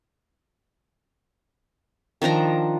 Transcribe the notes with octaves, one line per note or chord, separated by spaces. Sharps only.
D#3 F3 D4 A#5